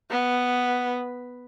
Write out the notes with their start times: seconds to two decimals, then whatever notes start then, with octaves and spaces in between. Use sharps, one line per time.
0.10 B3